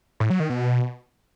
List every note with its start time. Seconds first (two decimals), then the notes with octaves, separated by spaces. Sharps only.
0.20 A2
0.30 F#3
0.40 D#3
0.50 B2